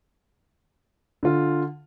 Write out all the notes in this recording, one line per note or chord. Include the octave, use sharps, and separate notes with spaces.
D3 F4